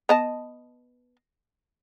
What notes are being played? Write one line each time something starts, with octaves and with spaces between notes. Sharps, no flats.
B3 D#5 A5